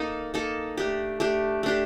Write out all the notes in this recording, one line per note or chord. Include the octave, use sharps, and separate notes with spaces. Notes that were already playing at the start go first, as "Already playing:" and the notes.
Already playing: A#3 D#4 A4
A#3 D#4 A4
A3 D4 G4
A3 D4 G4
A3 D4 G4